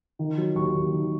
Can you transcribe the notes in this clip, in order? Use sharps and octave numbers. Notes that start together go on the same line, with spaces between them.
D#3
F#3
D#2 C#6
D#2
D#3